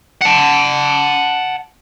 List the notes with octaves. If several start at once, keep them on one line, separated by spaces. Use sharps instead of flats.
F#5 A5